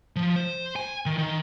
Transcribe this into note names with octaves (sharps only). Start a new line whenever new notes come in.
F3
C5
G#5
D#3
D#3